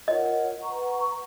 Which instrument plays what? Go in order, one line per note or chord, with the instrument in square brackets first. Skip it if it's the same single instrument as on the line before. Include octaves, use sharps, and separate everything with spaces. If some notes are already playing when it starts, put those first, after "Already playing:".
[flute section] F4 A#4 C#5 F#5 [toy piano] D#5
[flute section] B4 F#5 A#5 C#6